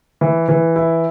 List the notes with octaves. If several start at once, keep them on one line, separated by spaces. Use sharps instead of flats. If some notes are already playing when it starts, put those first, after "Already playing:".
E3
E3
E4